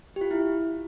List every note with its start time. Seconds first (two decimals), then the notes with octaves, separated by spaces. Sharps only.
0.16 G4
0.21 F4
0.31 E4